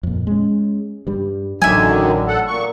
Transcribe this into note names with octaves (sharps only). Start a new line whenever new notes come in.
F2 A#2
G#3 C#4
G2 G3
A1 F#2 D3 D#3 F#3 E5 G#5
A4 F#5
A#2 C#6